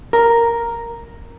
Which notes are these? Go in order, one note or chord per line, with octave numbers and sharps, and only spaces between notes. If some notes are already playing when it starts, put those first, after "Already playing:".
A#4